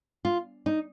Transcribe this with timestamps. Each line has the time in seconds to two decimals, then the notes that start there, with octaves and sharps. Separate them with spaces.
0.25 F4
0.66 D#4